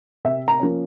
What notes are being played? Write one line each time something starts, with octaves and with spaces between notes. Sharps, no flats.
C3 E5
A#5
F3 A#3 C#4